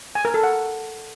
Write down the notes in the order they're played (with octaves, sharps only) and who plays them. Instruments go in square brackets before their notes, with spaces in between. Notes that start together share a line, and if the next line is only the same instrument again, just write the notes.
[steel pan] G#5
A#4
A4
F#5